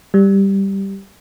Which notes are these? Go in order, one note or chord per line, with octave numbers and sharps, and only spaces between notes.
G3